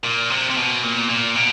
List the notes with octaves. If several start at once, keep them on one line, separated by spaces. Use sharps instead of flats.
A#2
C3
C3
B2
A#2
A#2
B2